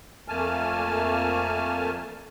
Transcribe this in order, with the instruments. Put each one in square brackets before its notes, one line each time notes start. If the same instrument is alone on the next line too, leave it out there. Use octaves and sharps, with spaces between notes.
[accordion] F2 A3 A#3 G#5 A5 F6